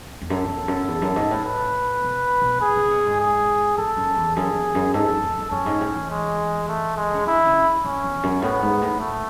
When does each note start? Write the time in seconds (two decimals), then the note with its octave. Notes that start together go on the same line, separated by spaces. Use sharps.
0.22 E2
0.29 F#2 A4
0.48 E2
0.68 F#2
0.88 E2
1.02 F#2
1.16 G#2
1.31 A2
1.45 B4
2.03 B2
2.42 B2
2.61 G#4
2.76 C#3
2.90 B2
3.06 G#2
3.20 G#4
3.78 G#2 A4
3.97 F#2
4.16 E2
4.36 F#2 G#4
4.55 E2
4.75 F#2
4.94 G#2 A4
5.08 F#2
5.23 E2
5.38 F#2
5.51 F#2 C#4
5.66 G#2
5.81 A2
5.96 E3
6.10 G#3
6.68 A3
6.97 G#3
7.14 C#3
7.26 D3 E4
7.45 C#3
7.84 A2 C#4
8.04 E2
8.23 F#2
8.42 A2 B3
8.62 G#2
8.82 A2
9.00 A2 A3